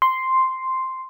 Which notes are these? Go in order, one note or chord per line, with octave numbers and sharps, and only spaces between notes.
C6